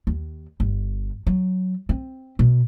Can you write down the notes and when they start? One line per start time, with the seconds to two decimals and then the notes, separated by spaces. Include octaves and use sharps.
0.07 D#2
0.60 G1
1.27 F#3
1.89 C4
2.39 B2